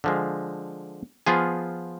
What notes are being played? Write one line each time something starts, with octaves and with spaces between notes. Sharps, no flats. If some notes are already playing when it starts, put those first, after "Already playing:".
D3 F3 G#3
F3 B3 F4 G#4